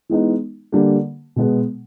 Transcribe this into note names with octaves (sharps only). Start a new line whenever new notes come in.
E3 G#3 B3 D#4
D3 G3 A#3
B2 G#3 B3